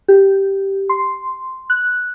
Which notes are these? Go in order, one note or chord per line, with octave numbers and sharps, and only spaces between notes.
G4
C6
F#6